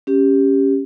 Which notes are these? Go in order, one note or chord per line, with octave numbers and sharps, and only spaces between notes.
C#4 G4